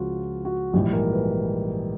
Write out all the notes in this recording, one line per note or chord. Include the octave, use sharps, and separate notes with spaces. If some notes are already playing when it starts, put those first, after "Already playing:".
Already playing: C#2 C#3 F3 F4 F#4
F#4
A#1 G#2 E3 G3 G4
A#4
B4